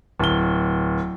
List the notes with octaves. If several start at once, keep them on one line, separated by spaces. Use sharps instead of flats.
D1 G7